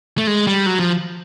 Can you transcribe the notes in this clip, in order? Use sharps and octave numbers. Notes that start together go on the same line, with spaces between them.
A3
G#3
G3
F#3
F3